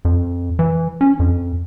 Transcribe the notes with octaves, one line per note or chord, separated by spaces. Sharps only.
F2
E3
C#4
F2